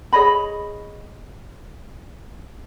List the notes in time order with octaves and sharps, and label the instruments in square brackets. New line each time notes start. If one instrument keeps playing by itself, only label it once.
[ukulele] G#4 C#5 D#5 B5